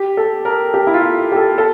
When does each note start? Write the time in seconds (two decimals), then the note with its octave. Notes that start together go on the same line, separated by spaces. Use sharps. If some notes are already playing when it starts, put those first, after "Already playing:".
Already playing: G4
0.17 A4
0.45 A#4
0.74 G4
0.87 E4
0.94 F4
1.32 G4
1.36 A4
1.58 A4